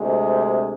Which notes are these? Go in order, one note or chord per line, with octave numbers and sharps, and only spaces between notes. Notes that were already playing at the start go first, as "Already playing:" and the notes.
Already playing: D2 C3 G#3